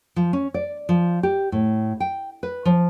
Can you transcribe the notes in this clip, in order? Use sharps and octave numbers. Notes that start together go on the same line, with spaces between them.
F3
C#4
D5
F3
G4
A2
G5
B4
F3